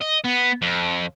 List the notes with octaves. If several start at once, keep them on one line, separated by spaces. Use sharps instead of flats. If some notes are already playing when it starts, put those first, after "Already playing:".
D#5
B3
F2